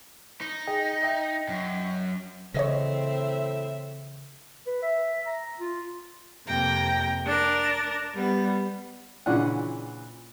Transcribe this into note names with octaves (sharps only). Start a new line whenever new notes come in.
D#4
G#4 D#5 G5
D#5 E5 G5
F#2
A2 C#3 E3 C4 C#5 D#5 E5 A#6
B4
E5
A#5
F4
F2 C3 A#3 G5 A#5
D4 A#4 A6
G3 B3
A#2 C#3 E3 C#4 D4 F#5